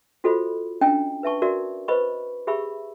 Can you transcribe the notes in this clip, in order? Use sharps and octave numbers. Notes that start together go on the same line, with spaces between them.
F4 F#4 A4 C5 D#5 B5
C#4 D4 D#5 G5 A#5
B4 E5 A5 C#6
F#4 A#4 D5 E5
B4 C5 D#5 B5 C#6
G4 G#4 E5 B5 C#6 E6